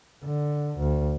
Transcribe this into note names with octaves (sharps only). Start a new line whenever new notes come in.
D3
D2